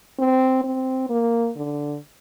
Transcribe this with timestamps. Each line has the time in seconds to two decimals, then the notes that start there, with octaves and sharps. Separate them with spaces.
0.19 C4
0.64 C4
1.09 A#3
1.56 D3